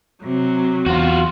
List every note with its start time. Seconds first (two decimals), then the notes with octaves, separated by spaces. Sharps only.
0.21 C3 F#3
0.86 E2 F4 F#4